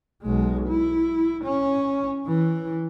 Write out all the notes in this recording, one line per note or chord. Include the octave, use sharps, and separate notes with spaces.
B1 G#3
E4
C#4
E3